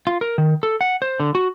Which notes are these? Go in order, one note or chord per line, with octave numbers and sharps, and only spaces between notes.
F4
A#4
D#3
A4
F#5
C5
D3
F#4